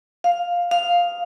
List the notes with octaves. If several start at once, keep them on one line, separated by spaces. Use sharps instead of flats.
F5
F5